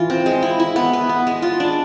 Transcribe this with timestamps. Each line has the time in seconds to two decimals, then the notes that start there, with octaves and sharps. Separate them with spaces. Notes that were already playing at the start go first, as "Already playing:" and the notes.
Already playing: E3 F4
0.10 C4
0.26 G#3
0.42 E4
0.60 E4
0.76 B3
0.93 B4
1.09 B3
1.27 G#3
1.42 F4
1.60 D4